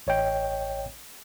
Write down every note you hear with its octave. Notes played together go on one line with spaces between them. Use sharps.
A1 C#5 D#5 G5